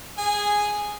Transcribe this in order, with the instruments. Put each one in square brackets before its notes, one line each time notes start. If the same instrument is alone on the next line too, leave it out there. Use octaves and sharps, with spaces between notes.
[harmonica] G#4 G#5